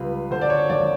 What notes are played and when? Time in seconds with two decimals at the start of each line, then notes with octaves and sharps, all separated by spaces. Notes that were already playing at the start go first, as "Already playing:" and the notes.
Already playing: C#2 G3 B4
0.31 D3 C5
0.41 D5
0.50 C#5
0.70 G#1 D5